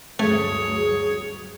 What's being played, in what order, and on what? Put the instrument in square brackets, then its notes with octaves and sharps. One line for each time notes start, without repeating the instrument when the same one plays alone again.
[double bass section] D2 G2 F#3 [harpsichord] A3 [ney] G#4 [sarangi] C#5